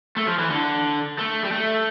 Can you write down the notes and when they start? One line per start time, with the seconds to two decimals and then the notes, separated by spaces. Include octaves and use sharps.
0.17 A3
0.27 F3
0.39 E3
0.50 D3
1.18 A3
1.44 G3
1.52 A3